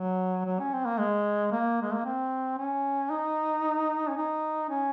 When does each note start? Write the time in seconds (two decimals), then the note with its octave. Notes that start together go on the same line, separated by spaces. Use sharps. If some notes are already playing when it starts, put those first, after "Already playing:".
Already playing: F#3
0.46 F#3
0.59 C#4
0.73 C4
0.86 A#3
0.98 G#3
1.52 A#3
1.82 G#3
1.93 A#3
2.05 C4
2.58 C#4
3.10 D#4
4.09 C#4
4.17 D#4
4.70 C#4